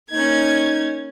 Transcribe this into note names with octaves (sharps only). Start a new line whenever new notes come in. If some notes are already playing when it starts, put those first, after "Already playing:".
A#3 C#4 D#4 G#6